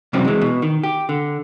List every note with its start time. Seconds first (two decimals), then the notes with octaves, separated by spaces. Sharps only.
0.13 F#2 C3 E3 F3 G3 C4
0.25 E3 G#3
0.41 B2
0.62 D#3
0.83 G4
1.09 D3